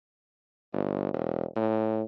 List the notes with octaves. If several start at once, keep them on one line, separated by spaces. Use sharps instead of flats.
G1
E1
A2